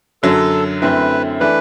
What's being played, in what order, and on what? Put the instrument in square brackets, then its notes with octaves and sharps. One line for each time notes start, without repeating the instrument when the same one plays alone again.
[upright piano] F#2 D3 F#3 [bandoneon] A4
[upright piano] F#2 D3 A3 C4 E4 [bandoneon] B4
[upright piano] E3 A3 D4 [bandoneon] B4